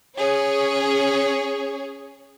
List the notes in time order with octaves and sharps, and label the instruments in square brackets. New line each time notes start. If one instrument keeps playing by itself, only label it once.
[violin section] C#4 G#4 C#5